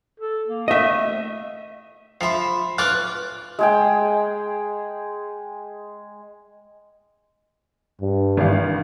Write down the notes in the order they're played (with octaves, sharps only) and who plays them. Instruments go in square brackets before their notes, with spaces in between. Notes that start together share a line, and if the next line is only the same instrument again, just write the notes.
[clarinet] A4
A#3
[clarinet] A3 [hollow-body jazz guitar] D#5 E5
[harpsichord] F3 E5 [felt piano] B5 C6 C7
[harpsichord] F4 D5 C#6 [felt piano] B4 F6 F#6
[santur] G#3 G#4 G5
[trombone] G2
[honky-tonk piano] G#1 E3 F5